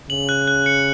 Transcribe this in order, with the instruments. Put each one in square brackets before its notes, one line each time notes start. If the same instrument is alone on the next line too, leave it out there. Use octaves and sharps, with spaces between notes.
[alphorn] C#3 [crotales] F#7
[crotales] F#6
F#6
C#7